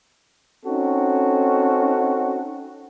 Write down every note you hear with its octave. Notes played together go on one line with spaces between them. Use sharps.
C4 C#4 D#4 F#4 A4